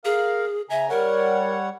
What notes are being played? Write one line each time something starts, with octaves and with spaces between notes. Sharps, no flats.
G#4 A#4 F5
C#3 E5 G#5 A#5
G3 A#4 C#5 F#5